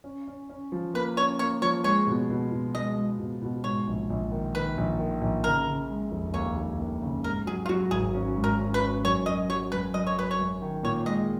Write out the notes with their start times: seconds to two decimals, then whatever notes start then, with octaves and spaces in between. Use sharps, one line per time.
0.04 C#4
0.28 C#4
0.50 C#4
0.72 F3
0.94 A#3 B4
1.16 C#4 C#5
1.39 A#3 C#5
1.62 F3 C#5
1.84 G#3 C#5
2.07 B2
2.30 B2
2.52 B2
2.75 G#3 D#5
2.97 G#3
3.19 B2
3.42 B2
3.64 G#2 C#5
3.87 A#1
4.10 A#1
4.32 D#3
4.55 D#3 B4
4.77 A#1
4.99 D#3
5.22 A#1
5.44 C#3 A#4
5.66 C#3
5.90 G#3
6.11 F1
6.34 D#2 C#5
6.57 D#2
6.79 D#2
7.02 C#3
7.24 G#2 A#4
7.47 F#3 G#4
7.66 F4
7.69 F#3 F#4
7.91 G#1 G#4
8.14 C#4
8.36 G#2
8.44 A#4
8.59 C#4
8.74 B4
8.81 C#4
9.04 F#2 C#5
9.26 F#2 D#5
9.49 F#3 C#5
9.72 F#2 B4
9.94 F#2 D#5
10.07 C#5
10.17 F#2 B4
10.31 C#5
10.39 F#2
10.62 D#3
10.83 A#2 C#5
11.06 G#3 D#5